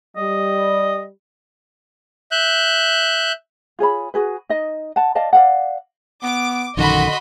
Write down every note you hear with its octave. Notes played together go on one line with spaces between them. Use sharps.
G3 D#5
E5 F#6 G6
F4 G#4 C#5 B5
F#4 G#4 B4
D#4 D#5
F#5 A5
D5 D#5 F5 A5
D5 F5 F#5
B3 D6
A#1 F#2 D3 D#3 F#4 D#5 B5 C6